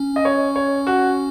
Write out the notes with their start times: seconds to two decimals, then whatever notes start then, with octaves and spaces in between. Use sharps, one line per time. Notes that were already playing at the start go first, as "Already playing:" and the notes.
Already playing: C#4
0.16 D#5
0.25 C#5
0.56 C#5
0.87 F#4